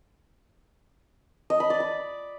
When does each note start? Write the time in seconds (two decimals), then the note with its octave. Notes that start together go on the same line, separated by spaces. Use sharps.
1.50 D#5
1.60 B5
1.70 D5
1.80 B5